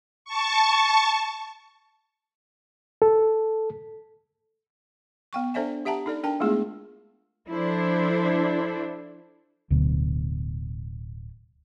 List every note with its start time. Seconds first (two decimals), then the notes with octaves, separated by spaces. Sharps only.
0.25 A5 C#6
3.02 A4
5.33 B3 G5 C#6
5.54 D4 A4 C5 D5 E5 G#5
5.85 G4 E5 F#5 A5 A#5
6.06 D#4 A4 D5
6.23 D4 A#4 G5 A5
6.40 G#3 A3 B3 E4 F4 G#4
7.48 F3 D4 E4 A4 C5
9.70 D1 D2 B2